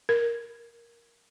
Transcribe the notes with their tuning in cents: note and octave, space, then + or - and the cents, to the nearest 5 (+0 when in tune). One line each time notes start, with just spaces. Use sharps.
A#4 +5